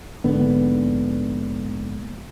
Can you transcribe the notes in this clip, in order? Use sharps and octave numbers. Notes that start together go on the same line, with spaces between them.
A#1 G#2 D3 B3